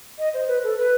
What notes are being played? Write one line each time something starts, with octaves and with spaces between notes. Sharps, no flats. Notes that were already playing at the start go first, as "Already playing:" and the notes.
D#5
C5
B4
A4
B4